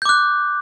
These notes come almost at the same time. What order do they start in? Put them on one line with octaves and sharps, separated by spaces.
G6 D6 F#6